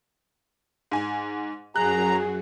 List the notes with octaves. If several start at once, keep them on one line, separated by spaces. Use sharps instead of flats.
G#2 G#5
F#2 F#3 G#4 A#5 F#6